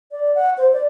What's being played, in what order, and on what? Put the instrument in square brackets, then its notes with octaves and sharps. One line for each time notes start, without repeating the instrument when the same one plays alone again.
[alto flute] D5
F#5
C5
D5